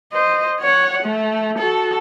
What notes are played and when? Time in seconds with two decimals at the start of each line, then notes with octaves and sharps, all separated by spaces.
0.13 C5 D#5
0.60 C#5 F#5
1.02 A3
1.58 F#4 A4